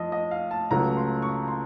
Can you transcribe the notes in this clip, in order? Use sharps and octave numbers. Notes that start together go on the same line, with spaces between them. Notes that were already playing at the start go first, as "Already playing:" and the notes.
Already playing: F2 F3 D#5
D#5
F5
A5
C#2 C#3 F#3 A3 A#5
C6
C#6
C6